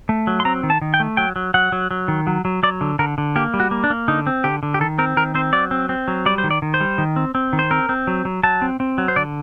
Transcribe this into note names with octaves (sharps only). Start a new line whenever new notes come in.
A3
F#3
C6
C4 A#5
D#3
A5
D#3
G5
A3
F#3 G5
F#3
F#3 F#5
F#3
F#3
D#3
F#3
F#3
F#3 D5
D3
D3 A#4
D3
A#3 G4
G3
F#4
A#3
D4
A#3
D3 D#4
C4
D3 G4
D3
G4
D#3 A4
C4 A#4
D#3 A#4
C4 C5
F#3 D5
C4
C4
F#3
G3 D5
C5
D#3
D5
D#3
C5
G3
D#3
C4
C4
D#3
C5
C4 A#4
C4
F#3
F#3
F#3 A5
C4
C4
F#3
C5
D3 D5